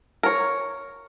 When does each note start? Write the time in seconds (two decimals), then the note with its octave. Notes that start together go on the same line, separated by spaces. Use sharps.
0.23 A#4 C#5